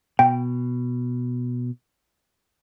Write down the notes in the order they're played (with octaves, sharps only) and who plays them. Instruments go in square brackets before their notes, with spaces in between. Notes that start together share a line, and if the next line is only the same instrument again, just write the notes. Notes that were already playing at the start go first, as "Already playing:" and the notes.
[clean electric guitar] B2 [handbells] G5